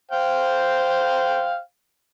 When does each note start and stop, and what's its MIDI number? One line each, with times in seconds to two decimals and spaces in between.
0.11 1.59 72
0.11 1.59 77
0.11 1.59 79